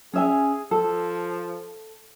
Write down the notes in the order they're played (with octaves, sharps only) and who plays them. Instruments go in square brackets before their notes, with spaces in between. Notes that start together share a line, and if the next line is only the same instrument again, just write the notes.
[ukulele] C#4 E5 G#5 [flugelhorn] G#4
[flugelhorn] F3 [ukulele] A4